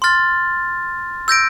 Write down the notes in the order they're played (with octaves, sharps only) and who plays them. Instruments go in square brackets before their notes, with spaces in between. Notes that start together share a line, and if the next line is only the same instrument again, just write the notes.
[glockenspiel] C6 F6 A6
E6 G6 A#6 D7